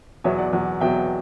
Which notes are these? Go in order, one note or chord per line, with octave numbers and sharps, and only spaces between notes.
E2 B2 F#3 C#5 E5
D5 F#5
E2 B2 F#3
E2 B2 F#3 E5 G5